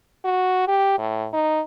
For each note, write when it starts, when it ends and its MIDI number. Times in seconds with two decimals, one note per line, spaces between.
0.25 0.63 66
0.68 0.95 67
0.99 1.27 45
1.34 1.61 63